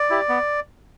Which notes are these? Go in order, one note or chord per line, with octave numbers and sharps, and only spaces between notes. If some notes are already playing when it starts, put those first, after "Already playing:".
Already playing: D5
E4 G4
B3